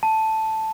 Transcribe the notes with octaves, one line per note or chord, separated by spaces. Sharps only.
A5